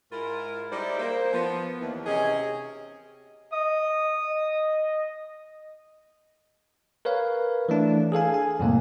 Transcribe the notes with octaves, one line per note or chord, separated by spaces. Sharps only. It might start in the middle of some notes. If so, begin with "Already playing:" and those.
G#2 E4 F4 A#4
G3 D#4 E4 G#4 C5 D5
A#3 C5
F3 B3
D#2 E3
C3 C#4 G#4 D#5
D#5 D#6
D#5
A#4 B4 C#5 F5
E3 A3 D4
G#4 A4 F5 G#5
G#5
F2 A2 C3 G3 A3 A#3